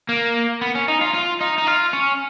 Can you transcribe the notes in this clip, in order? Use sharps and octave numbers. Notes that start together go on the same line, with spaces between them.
A#3
B3
C#4
D#4
F4
F4
D#4
D#4
F4
C#4